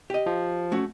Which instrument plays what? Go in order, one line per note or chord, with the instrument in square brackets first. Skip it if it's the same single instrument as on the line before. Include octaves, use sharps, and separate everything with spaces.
[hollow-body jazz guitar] G4 D#5
[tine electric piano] F3
[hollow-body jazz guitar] A3 C#4 F#4